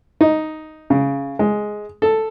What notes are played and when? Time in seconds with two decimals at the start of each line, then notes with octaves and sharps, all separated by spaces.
0.21 D#4
0.90 C#3
1.39 G#3
2.02 A4